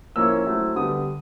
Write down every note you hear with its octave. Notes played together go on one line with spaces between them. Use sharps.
F3 A#3 C#4 E4 E6
F#3 A3 C4 E4
D3 G3 B3 D#6